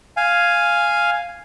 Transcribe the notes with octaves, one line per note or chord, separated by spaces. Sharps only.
F5 G#5